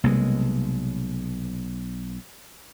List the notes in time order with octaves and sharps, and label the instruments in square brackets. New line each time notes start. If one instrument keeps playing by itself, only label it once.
[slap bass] B1 G#3 [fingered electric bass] C3 G3 A#3